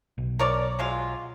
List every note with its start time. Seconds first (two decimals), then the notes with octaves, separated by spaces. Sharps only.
0.18 B1
0.39 A#4 C#5 D5
0.79 F#3 G#3 F4